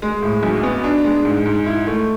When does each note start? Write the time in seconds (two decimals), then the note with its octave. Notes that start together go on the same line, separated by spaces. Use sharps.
0.02 G#3
0.22 A2
0.43 B1
0.63 B3
0.84 D4
1.04 G#3
1.25 G#2
1.46 G#2
1.66 E4
1.87 A3